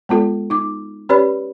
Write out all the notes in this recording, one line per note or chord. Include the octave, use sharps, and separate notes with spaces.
G#3 B3 F4 A4
D#4 D6
C#4 G4 B4 C#5 D5 B5